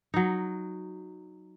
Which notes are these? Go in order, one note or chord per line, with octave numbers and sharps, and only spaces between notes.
F#3 D#4